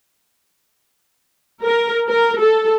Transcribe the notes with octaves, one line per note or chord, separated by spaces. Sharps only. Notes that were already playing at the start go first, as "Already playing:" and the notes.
A#4
A#4
A4